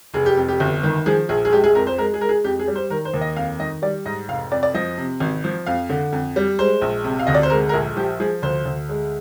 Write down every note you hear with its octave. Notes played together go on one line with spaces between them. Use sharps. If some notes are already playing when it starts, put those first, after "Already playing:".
F1 G#4
G4
F2
G4
G1
D#3
F3 G#4
A#1 G#4
G#4
G#3 G4
G#4
F2 A#4
C5
G#3 A#4
G#4
G#3 A#4
G#4
F2 G4
G#4
G3
C5
D#3 A#4
C5
D#2
D#5
F2 F5
D#3 D#5
G3 D5
G#2 D#5
F1 F5
F2 D5
D5
F3 D#5
C3
G#1
F3
F2 F5
D3
F2
G3
G#3 C5
A#1
C3
F5
D2 D#5
D5
C5
G#3 A#4
A#4
A#1 G#4
F3 G4
F3 G#4
D2 C5
D2
G#3